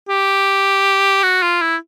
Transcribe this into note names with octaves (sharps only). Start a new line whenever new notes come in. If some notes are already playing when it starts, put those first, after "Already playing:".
G4
F#4
F4
E4